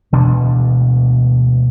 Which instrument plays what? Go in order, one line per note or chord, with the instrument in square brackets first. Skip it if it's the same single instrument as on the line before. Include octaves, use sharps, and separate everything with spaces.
[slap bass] E1 D2 B2 D4